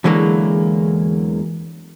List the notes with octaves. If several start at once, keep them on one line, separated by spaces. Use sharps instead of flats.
E2 D3 E3 F#3 G#3 A#3